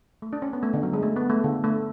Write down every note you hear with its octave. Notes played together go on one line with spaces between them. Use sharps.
A3
D4
C#4
B3
A3
D3
F#3
G#3
A3
B3
A3
D3
A3